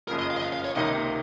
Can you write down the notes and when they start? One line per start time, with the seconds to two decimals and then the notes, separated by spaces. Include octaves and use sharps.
0.08 F#1 F2 C#3 F3 A#4
0.19 D#5
0.30 F5
0.37 D#5
0.42 F5
0.53 F5
0.64 C#5
0.76 C#2 C3 D#3 A#3 D#4 D#5